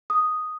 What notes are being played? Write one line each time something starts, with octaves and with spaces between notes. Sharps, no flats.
D#6